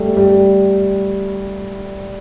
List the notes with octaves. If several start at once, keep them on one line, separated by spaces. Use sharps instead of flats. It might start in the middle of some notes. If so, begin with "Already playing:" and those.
Already playing: G3 A3
G3